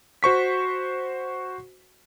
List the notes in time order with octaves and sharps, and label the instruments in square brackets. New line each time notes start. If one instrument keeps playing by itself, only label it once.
[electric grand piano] F#4 C5 C#6 B6